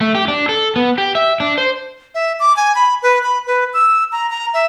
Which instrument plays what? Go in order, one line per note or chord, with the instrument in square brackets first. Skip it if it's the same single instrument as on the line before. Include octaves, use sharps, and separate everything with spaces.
[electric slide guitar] A3
G4
D4
A4
B3
G4
E5
D4
C5
[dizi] E5
D6
G#5
B5
B4
B5
B4
E6
A#5
A#5
E5